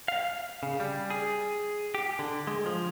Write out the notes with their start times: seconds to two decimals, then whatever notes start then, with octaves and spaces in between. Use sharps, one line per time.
0.08 F5
0.63 C#3
0.80 G3
1.10 G#4
1.95 G4
2.19 D3
2.47 G#3
2.66 F3